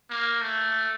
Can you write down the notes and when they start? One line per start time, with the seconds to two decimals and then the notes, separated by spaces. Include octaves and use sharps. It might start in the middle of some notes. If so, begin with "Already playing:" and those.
0.10 A#3
0.41 A3